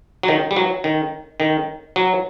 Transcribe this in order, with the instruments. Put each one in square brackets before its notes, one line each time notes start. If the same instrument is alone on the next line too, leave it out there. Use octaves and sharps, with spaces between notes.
[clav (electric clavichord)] F#3
D#3
G3
F#3
D#3
D#3
F#3